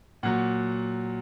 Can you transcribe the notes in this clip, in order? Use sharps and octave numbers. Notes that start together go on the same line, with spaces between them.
A#2 F#3 F#5